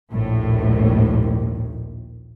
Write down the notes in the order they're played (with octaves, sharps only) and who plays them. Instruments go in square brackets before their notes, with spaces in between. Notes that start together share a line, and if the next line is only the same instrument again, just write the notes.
[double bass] A#1 D#2 [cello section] A2